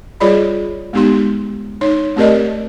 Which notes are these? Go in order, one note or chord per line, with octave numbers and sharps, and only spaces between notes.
G3 F4 G#4 C#5 D5 B5
G#3 B3 D#4 G4 C6
D#4 C#5
A3 C4 G4 A#4 D5 D#5